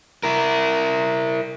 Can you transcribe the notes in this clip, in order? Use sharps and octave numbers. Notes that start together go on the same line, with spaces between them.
E4 A#4